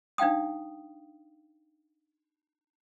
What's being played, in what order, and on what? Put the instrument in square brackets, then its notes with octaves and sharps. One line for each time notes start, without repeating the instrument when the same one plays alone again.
[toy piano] D4 D#4 F5 G5 D#6